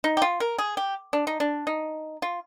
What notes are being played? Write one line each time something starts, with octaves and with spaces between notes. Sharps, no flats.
D#4
G4
F4
A#4
G#4
G4
D4
D#4
D4
D#4
F4